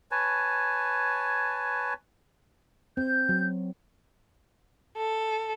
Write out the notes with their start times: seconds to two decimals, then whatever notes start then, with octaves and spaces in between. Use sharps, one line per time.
0.11 B4 C#5 G#5 A5
2.97 C4 G6
3.29 F#3
4.97 A4